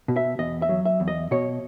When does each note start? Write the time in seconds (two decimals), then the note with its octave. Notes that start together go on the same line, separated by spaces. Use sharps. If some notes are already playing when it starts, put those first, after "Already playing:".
0.08 B2
0.16 E5
0.39 E2 D#5
0.62 E5
0.69 F#3
0.85 E5
1.00 E2
1.08 D#5
1.31 B2 C#5